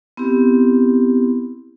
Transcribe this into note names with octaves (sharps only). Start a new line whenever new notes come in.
B3 C4 E4 G4